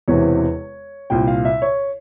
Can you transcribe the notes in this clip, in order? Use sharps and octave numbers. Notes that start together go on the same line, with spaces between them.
E1 E2 C3 E3 C#5
C2 A#2 G5
F5
E5
C#5